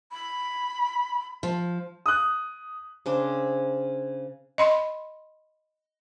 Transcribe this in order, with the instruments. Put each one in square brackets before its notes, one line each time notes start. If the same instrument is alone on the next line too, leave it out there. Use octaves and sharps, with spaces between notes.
[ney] B5
[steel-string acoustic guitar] F3
[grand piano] D#6 F#6
[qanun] C#3 C4 D4
[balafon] D#5 B5 C6